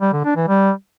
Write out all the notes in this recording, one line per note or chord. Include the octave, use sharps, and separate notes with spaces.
G3
D3
D4
E3
G3